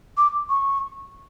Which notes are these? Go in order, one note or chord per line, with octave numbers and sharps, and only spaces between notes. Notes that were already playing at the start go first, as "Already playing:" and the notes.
D6
C#6